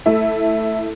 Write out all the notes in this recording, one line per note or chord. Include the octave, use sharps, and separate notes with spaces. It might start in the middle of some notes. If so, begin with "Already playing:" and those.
A3 E4